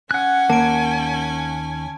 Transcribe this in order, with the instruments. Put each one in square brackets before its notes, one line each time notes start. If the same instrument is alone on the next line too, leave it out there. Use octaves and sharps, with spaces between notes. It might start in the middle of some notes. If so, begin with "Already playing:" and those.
[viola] C#4 G#5 [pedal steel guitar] F#5 F#6
[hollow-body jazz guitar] D#2 A#3 [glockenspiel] A5 D7